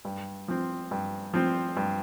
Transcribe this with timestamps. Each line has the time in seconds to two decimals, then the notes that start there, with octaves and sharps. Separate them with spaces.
0.05 G2
0.48 F3 C4
0.91 G2
1.34 F3 C4
1.77 G2